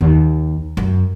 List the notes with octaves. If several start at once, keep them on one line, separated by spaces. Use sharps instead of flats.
D#2
F#2